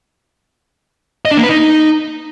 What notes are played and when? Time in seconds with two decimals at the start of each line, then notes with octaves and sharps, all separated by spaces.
1.25 D#5
1.31 D4
1.37 A#3
1.43 B4
1.49 D#4